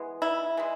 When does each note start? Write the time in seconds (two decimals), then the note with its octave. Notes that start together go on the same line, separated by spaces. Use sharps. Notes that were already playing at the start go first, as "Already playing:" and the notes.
Already playing: E3 G#3 B3
0.22 E4
0.57 E3 G#3